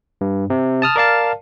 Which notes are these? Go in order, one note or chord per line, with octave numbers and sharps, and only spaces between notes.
G2
C3
A5 D#6 F6
A#4 D5 F5 A5